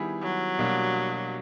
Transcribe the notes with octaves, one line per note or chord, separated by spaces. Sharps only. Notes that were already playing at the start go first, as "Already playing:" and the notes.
Already playing: D#3 G3 B3 E4 G#4
F#3
B2 G3 A#3 D4